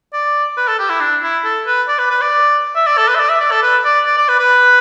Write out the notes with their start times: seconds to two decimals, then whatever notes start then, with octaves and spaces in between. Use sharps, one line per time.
0.14 D5
0.57 B4
0.68 A4
0.79 G4
0.89 E4
1.00 D4
1.23 E4
1.44 A4
1.67 B4
1.88 D5
1.99 B4
2.10 B4
2.21 D5
2.76 E5
2.86 D5
2.97 A4
3.08 B4
3.15 E5
3.19 D5
3.29 E5
3.41 D5
3.51 A4
3.63 B4
3.85 D5
4.06 D5
4.18 D5
4.28 B4
4.40 B4